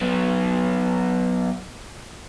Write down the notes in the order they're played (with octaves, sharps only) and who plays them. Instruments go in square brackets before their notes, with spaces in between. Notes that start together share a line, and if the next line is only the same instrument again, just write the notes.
[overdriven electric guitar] F#3 B3